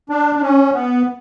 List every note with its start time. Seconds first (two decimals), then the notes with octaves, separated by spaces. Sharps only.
0.10 D4
0.35 D4
0.42 C#4
0.74 B3